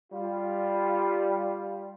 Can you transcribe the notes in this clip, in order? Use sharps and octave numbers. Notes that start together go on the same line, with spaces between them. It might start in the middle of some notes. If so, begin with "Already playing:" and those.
G3 F4